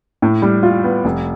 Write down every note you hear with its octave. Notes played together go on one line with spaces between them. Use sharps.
A2
G3
F4
B3
F1